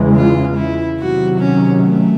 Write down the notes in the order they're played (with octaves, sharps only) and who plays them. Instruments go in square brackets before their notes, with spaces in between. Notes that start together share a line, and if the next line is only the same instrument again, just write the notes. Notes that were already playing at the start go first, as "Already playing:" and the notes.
Already playing: [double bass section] E2 C#3 E3 G#3
[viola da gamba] F4
E4
[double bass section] C3 D#3 F#3 [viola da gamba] F#4
[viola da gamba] C#4
A3